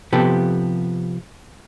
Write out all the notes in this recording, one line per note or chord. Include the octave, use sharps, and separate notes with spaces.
C3 F3 B3 G4 A4